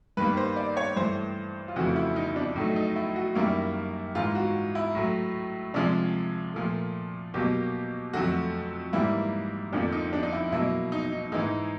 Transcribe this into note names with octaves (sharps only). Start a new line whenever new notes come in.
G2 D#3 G3 A#3 B4
C5
D5
C#5
G2 E3 A3 C5
F4
F2 C#3 E3 A3 F#4
E4
D#4
D4
A2 F#3 A3 D#4
D#4
E4
F#4
F#2 D#3 G3 A#3 E4
G#2 E3 G#3 F4
F#4
E4
A2 F#3 A3
C3 F3 G#3 D4
A#2 F3 A3
B2 F#3 A#3 G4
F2 D3 F#3 A3 F#4
G#2 E3 G3 A#3 E4
F2 D3 F3 A#3 D4
D#4
D4
D#4
E4
B2 F#3 A#3 E4
D#4
D#4
G#2 E3 G#3 D#4